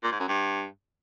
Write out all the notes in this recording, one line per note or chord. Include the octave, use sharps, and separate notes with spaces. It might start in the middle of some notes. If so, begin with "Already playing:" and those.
A#2
G#2
F#2
G2